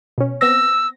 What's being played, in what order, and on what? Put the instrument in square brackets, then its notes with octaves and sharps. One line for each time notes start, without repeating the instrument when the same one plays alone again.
[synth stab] B2 C#4
[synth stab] B3 C4 A#6 [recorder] E6